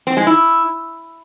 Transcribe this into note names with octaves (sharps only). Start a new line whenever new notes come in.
C4
G#3
E4